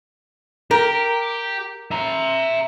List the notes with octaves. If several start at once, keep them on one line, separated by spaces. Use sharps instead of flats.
G4 A#4
E5 A#5